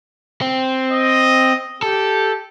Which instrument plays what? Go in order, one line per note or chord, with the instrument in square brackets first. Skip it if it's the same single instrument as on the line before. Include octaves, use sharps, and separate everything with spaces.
[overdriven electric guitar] C4
[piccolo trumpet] D#5
[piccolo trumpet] G4 [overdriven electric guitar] A4